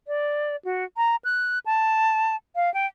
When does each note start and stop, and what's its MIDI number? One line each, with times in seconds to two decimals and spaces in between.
0.07 0.56 74
0.65 0.84 66
0.97 1.16 82
1.24 1.59 90
1.66 2.36 81
2.55 2.72 77
2.74 2.86 79